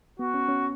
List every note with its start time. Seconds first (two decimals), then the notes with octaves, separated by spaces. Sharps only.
0.19 B3 F#4
0.34 C#4
0.49 C#4